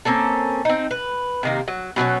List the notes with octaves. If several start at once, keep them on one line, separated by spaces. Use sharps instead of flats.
A#3 C4 C#4 A4
C4 D#4
B4
C3 D#3 A#3
F#3
B2 F#3 A3 C#4